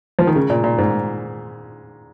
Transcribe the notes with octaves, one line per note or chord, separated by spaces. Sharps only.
F3
D#3
C#3
A#2
A#2
G#2